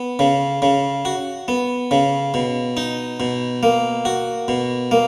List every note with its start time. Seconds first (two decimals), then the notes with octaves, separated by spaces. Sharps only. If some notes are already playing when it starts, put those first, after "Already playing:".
Already playing: B3
0.19 C#3
0.62 C#3
1.05 F#4
1.48 B3
1.91 C#3
2.34 B2
2.77 D#4
3.20 B2
3.63 A#3
4.05 F#4
4.48 B2
4.91 A#3